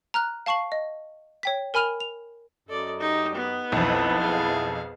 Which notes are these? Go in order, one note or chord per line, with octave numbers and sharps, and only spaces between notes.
A#5 F6 F#6
F5 A5 C#6 C7 F#7
D#5
C#5 G5 B6
A#4 G#5 B5 F6 D#7 F7
F7
F#2 A4 D5 D#5
D#4 G4
B3
B1 F2 E4 B4 A5
G#4 F5